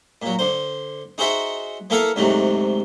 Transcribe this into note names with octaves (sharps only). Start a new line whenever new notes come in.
A#2 F#3
D3 C5
D#4 F#4 G#4 C5 E5 F#5
A#3 B3 E4 A4 F5 F#5
D2 G#2 C3 F#3 A3